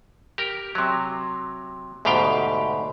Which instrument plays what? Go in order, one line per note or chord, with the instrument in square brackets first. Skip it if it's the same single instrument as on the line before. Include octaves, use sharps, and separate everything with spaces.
[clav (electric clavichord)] G4 A#4
C3 F#3
D2 G#2 B2 G4 F5 G5